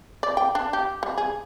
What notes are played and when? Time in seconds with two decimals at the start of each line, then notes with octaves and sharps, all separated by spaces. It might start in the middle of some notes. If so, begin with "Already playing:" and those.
0.23 D5
0.37 G5
0.55 D4
0.73 G4
1.03 G3
1.18 G#4